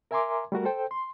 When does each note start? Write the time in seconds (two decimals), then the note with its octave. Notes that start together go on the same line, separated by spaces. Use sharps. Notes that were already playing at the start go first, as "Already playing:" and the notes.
0.11 A#4 E5 G#5 A#5 C6 D6
0.52 G3 A3 F#4 A#4
0.65 A4 C5 G5
0.91 C6